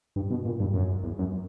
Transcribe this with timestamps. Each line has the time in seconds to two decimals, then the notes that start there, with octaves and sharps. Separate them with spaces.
0.16 G2
0.31 B2
0.46 A#2
0.60 G2
0.74 F#2
1.03 E2
1.19 F#2